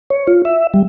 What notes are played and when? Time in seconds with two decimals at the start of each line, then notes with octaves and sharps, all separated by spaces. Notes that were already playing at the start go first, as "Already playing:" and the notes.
0.10 C#5
0.27 F4
0.45 E5
0.74 G3